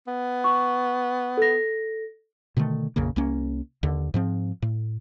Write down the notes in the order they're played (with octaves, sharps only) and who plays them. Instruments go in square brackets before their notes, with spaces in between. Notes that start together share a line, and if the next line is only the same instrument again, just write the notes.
[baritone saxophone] B3
[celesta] C#6
A4 A#6
[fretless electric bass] B2 D3 D#3 A3
A#1 F2 C#3 A#3
C2 A#3 C#4
D#2 D3
G#2 F3 C4
A2